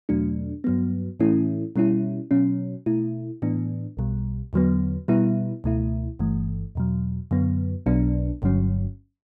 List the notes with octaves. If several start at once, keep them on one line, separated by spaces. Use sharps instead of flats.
E2 B2 F#3 A3 D4
G2 F#3 B3
A2 E3 A3 C#4 E4
B2 G3 C#4 E4
B2 F#3 C#4
B2 A3 E4
A2 E3 B3 D4
B1 B2 G3
E2 D3 F#3 B3
B2 G3 B3 E4
C#2 B2 A3 E4
G1 G2 E3 A3
E2 B2 F#3
F#2 D3 F#3 B3
B1 B2 F#3 B3 D4
G1 G2 D3 F#3 C#4